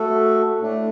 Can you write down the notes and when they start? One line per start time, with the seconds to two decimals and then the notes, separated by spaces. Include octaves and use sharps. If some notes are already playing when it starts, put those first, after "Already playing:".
Already playing: A3 F#4 A4
0.59 A2 A3 D4